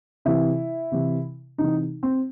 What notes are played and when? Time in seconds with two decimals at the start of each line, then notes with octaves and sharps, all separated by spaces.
0.25 C3 E3 E4
0.92 C3 E3
1.58 C3 E3 D#4
2.03 C4